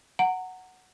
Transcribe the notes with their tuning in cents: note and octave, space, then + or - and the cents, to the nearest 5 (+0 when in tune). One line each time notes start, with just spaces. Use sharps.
F#5 +0 A#5 -25